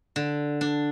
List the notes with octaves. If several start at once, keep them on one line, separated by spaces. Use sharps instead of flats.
D3
D4